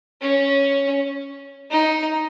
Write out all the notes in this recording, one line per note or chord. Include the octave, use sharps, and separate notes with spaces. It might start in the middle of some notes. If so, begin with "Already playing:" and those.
C#4
D#4